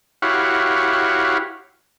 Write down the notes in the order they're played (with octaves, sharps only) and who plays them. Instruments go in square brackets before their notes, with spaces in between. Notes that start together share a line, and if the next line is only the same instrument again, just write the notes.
[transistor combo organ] E4 F#4 G4 C#5 F5 F#5